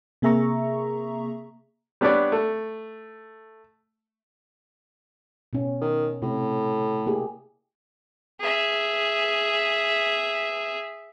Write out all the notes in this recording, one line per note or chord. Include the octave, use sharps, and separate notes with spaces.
C3 A#3 G#4 E5 A#5 C#6
G3 B3 D4 C#5 D5
A3
B2 C#4
D#3
A2 C3
A#3 G4 G#4
G#4 E5